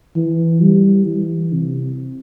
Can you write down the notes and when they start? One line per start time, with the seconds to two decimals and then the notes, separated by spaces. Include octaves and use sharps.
0.16 E3
0.61 G3
1.07 E3
1.53 C3